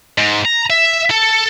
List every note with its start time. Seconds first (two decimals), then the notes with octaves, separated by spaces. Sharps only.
0.18 G#2
0.45 A#5
0.70 E5
1.10 A4